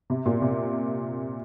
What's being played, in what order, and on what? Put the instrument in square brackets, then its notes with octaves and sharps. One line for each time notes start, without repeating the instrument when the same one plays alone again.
[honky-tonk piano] C3
A#2
C3